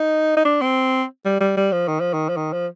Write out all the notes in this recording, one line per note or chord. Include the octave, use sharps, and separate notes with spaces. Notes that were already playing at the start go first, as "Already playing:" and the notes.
Already playing: D#4
D#4
D4
C4
G3
G3
G3
F3
D#3
F3
D#3
F3
D#3
F3